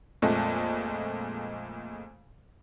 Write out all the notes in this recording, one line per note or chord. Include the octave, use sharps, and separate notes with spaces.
F2 A#2 G#3 A3